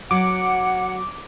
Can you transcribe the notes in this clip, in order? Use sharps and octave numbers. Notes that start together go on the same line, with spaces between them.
F#3 F#5 D6